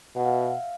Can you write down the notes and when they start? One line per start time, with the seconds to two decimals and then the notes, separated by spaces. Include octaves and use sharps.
0.16 B2 F#5
0.25 F5
0.34 E5
0.43 F5